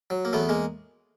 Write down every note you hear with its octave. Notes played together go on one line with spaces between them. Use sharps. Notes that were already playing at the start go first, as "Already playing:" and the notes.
F#3
A#3
E2 A3 B3
G#3 A#3